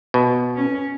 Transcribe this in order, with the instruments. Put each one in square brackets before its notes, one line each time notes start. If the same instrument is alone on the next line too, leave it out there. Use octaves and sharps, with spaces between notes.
[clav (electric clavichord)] B2
[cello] C#4